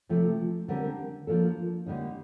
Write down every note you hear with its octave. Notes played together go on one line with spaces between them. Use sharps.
C3 F3 A3
D3 G3 C4 G4 A#4
F3 A#3 D4 A4
D3 G3 A#3 D#4